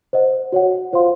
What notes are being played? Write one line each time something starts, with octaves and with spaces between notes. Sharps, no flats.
C5 D#5 F#5
F#4 C#5 F#5
F4 C5 F5 C6